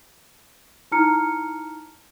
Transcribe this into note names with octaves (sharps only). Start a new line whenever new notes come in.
D#4 E4 A5 A#5 F6 C#7